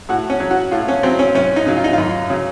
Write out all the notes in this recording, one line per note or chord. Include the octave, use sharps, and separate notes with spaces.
A2 F#4
C#4
F#3
F#4
A2 F4
C#4
F#3 C4
C#4
F#2 C#4
D#4
C#3 F#3
F4
D#4
F#2 F4
C#3 F#3